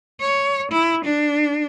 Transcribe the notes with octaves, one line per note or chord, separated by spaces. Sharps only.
C#5
E4
D4